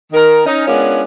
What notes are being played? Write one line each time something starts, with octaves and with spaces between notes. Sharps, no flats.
D#3 A#4
C#4 D#4
G#3 B3 C#4 D4 F4 A#4